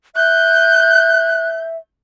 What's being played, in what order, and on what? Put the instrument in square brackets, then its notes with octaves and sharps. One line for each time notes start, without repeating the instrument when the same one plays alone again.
[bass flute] E5 [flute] F#6 [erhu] G6